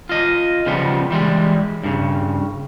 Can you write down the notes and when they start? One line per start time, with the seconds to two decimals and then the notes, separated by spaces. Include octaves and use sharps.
0.09 F4 D#5
0.66 C#3 F3 G3 B3
1.11 E3 G3 G#3
1.84 G2 C#3